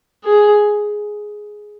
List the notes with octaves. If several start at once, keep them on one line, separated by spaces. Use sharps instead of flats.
G#4